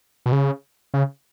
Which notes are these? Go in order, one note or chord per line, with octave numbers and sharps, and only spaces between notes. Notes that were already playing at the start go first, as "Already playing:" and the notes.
B2
C#3
C#3